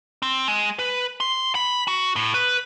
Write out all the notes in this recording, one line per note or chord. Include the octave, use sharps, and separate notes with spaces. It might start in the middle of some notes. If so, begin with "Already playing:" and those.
C4
G#3
B4
C6
B5
F#4
A2
B4